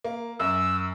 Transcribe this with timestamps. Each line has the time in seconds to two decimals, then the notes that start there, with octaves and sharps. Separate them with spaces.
0.04 A#3
0.40 F#2 E6